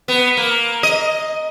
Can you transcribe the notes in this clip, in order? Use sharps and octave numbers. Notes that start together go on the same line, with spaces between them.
B3
A#3
D#5